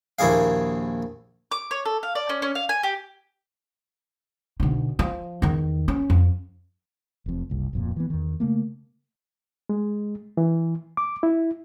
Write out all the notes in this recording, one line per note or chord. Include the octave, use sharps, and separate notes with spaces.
A#1 D#2 E4 G#4 F5
D6
C#5
A4
F5
D5
C#4
C#4
F5
G#5
G4
B1 D3
F3
E2 D#3
C#4
F2
F1 F2
F#1 C2
D1 F2 A#2
E3 B3
E2 D#3
C#3 E3 A3 A#3
G#3
E3
D6
E4